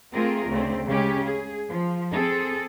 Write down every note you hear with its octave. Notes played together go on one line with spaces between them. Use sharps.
A3 C4 F4 G#4 A#4
D2 C#3 A3 C4
C#3 G#3 C#4 G4
G#4
F3
C4 G#4 A4